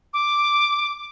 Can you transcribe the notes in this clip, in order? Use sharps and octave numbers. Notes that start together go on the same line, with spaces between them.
D6